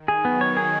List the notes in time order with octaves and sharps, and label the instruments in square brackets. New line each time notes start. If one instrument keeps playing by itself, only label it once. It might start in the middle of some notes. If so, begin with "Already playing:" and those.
Already playing: [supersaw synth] D#3
[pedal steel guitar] G#4
[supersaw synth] F#3 [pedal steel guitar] B3
[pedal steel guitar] C#5
G#4